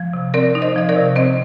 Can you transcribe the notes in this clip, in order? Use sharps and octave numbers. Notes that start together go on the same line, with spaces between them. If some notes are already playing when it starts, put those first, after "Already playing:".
Already playing: F3
C3
C4 A#4 D5
D#4
C5 D#5
F3 D#5
A#4 D5
C3
C4 C5 D#5